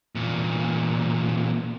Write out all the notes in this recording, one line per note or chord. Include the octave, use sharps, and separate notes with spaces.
E2 A#2